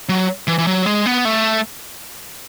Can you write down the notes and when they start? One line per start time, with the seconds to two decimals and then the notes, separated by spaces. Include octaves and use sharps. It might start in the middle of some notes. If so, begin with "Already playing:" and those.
0.09 F#3
0.47 E3
0.58 E3
0.67 F#3
0.86 G#3
1.06 B3
1.25 A3